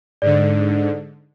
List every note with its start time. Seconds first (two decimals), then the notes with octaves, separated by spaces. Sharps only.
0.22 G#2 D3 D5